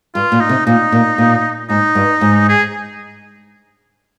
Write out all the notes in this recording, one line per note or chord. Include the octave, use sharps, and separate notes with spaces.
G2 F4
A#2
D#4
C3
A#2 D#4
A#2
A#2
G#2 D#4
G2
G#2
G#4